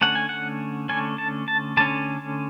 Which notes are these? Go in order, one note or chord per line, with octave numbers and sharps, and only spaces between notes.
D3 A3 C#4 F#5
G#5
F#5
D3 A3 C#4 G#5
A5
A5
D3 A3 C#4 A5